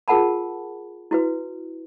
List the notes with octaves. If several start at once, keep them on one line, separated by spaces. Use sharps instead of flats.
F4 G#4 A#4 F#5 A5 B5
E4 F#4 B4